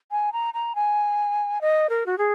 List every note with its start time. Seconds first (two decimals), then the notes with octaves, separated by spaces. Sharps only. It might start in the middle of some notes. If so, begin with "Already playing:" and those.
0.11 G#5
0.33 A#5
0.54 A#5
0.75 G#5
1.61 D#5
1.90 A#4
2.06 F#4
2.18 G#4